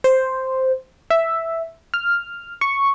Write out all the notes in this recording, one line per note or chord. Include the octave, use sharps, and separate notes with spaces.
C5
E5
F6
C#6